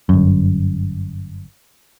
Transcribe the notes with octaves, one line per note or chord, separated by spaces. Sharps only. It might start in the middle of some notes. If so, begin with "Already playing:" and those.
G1 F#2